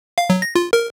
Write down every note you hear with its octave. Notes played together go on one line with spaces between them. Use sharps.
F5
F#3
A#6
F4
A#4